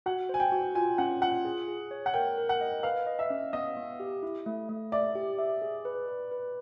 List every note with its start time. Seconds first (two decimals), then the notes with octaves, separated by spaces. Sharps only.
0.06 F#4 F#5
0.29 C5 G#5
0.40 G5
0.52 F#4
0.75 F4 G#5
0.98 C#4 F#5
1.21 F4 F#5
1.45 G#4
1.68 G#4
1.91 C#5
2.06 F#5
2.14 A#4 G5
2.38 A#4
2.49 F#5
2.61 D#5
2.83 B4 F5
3.07 D#5
3.19 E5
3.30 C#4
3.53 B3 D#5
3.77 B3
4.00 G4
4.23 E4
4.46 A3
4.69 A3
4.92 D5 E5
5.15 G4
5.39 E5
5.62 G#4
5.85 B4
6.08 B4
6.31 B4